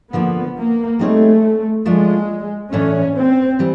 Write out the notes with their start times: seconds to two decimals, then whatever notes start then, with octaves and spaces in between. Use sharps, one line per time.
0.13 D3 F3 A#3 B3
0.56 A#3
0.99 G3 A3 C4 D#4 G#4 C#5
1.85 F3 G#3 A3 D4 F4
2.72 A2 E3 A3 C#4 D4
3.16 C4
3.59 E3 G3